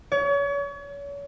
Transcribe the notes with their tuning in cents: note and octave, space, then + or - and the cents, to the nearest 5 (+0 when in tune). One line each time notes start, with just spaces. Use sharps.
C#5 +35